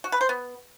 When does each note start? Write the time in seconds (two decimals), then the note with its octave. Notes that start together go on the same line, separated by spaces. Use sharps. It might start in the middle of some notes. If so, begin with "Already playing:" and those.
0.04 F#4
0.12 B4
0.21 C5
0.29 B3